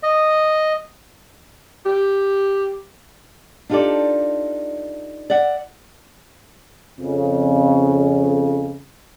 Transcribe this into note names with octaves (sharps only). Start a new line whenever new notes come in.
D#5
G4
D4 D#4 F4 G4 A4 D5
D5 E5 F#5
F2 C#3